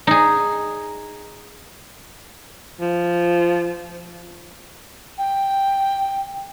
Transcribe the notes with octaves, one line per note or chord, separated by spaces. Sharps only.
D#4 G#4
F3
G5